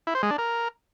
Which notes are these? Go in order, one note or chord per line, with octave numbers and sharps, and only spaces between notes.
E4
C5
G#3
D4
A#4